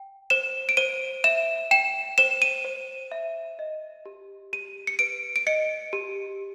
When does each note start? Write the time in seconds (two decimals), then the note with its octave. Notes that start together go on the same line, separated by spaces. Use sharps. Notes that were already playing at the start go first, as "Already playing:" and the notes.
Already playing: G5
0.30 C5 E7
0.69 D7
0.77 C5 D#7
1.24 E5 E7
1.71 G5 E7
2.18 C5 E7
2.42 D#7
2.65 C5
3.12 E5
3.59 D#5
4.06 G4
4.53 G4 D#7
4.87 C#7
4.99 B4 D7
5.36 D7
5.47 D#5 C#7
5.93 G4